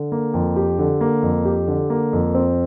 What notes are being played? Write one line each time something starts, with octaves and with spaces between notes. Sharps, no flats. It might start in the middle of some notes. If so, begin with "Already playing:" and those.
Already playing: D3
A#3
F2
G4
D3
A#3
F2
G4
D3
A#3
F2
C4